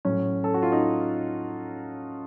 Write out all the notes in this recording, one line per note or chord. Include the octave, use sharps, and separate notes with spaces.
A2 F#3 C#4
A4
F#4
F4
D#4